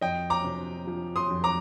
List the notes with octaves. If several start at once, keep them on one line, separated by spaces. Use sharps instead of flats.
F2 D#5 G5
A#5 D6
C3
F3
C6 D#6
F2
A#5 D6